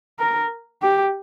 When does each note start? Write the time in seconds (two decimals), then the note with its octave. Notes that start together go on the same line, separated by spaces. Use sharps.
0.20 A#4
0.83 G4